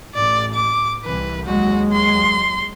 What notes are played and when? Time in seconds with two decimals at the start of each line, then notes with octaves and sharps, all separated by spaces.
0.14 A1 D5
0.54 D6
1.04 C2 E3 B4
1.46 D#2 F#3 G#3 F#4
1.92 C6